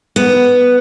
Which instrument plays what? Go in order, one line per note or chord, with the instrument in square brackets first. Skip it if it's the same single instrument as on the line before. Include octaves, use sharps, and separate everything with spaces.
[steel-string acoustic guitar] B3